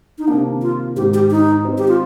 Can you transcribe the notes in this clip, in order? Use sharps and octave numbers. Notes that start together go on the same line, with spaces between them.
D#4
C3 D#3 A#3 D4
F4
G#2 D#3 G#3 G4
G4
D#4
D#3 G#3 C4 D#4
G4
F4